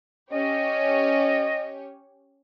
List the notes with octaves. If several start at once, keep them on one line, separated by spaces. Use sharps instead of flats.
C#4 G4 C#5 D#5